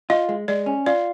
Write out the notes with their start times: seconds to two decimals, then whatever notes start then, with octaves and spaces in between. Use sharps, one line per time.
0.10 F4 D#5
0.29 G#3
0.48 G#3 D5
0.66 C#4
0.86 F4 D5